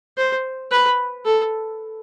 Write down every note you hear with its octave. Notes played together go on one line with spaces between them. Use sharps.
C5
B4
A4